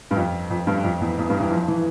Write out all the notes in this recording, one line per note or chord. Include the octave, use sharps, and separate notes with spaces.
G2
F2
F2
G2
F2
E2
E2
G2
E3
F3
E3